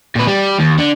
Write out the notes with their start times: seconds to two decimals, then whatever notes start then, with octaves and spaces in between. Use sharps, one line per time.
0.15 A#2 B4
0.27 G3 G4
0.59 D#2
0.79 D3